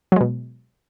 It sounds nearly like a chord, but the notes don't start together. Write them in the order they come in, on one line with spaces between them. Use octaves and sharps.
F#3 G#3 B2